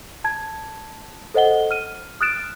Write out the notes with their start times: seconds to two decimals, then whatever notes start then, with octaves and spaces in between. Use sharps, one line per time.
0.24 A5 G#6
1.34 A4 C5 D#5 F#5 G7
1.71 F6 D#7
2.21 D#6 F6 F#6 A6 D7 E7